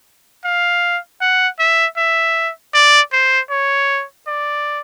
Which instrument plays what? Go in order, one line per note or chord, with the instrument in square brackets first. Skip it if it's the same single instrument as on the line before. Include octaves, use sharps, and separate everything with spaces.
[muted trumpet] F5
F#5
E5
E5
D5
C5
C#5
D5